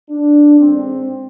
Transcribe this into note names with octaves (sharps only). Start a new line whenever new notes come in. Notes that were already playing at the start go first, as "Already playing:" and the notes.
D4
A1 G#2 G#3 C4